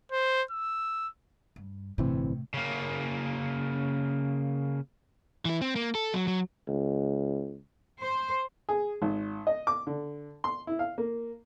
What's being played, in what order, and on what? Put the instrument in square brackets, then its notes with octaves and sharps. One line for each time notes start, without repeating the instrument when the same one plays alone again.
[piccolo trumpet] C5
E6
[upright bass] G2
[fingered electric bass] G1 E3 C4 [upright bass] A2 C3
[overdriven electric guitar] C#3 A#3
E3 E4
C4
A#3
A4
F#3
F#3
[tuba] C#2
[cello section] C5
[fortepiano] G#4
G#1
D#5
D6
D3
C6
E4
F5
A#3